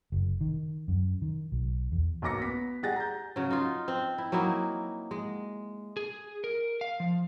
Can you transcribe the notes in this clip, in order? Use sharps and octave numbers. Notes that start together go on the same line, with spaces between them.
F#1
D#3
F#2
D#3
B1
E2
B1 A#3 D6 A#6 C#7
B3 B6
G3 G#4 F#5 A6 A#6
A#5 G6
C#3 F#3
D#4 F4
C4
E4
F#3 A#3 D#4 E4
G#3
G#4
A#4
F5
F3